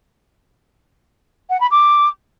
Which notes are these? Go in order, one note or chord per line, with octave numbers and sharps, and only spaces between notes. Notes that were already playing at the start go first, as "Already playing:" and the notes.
F#5
B5
D6